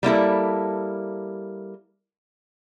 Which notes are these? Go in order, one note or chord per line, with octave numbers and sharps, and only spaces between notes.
G3 A#3 E4 A4